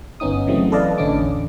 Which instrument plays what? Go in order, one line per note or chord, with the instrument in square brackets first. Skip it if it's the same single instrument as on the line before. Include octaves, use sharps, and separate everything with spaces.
[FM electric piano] G1 B3 C#4 D#4 D#6
C#3 E3 F#3 A3 B3 C4
A4 B4 D5 D#5 F5 A5
A1 A2 D3 C#4 D4 D6
E2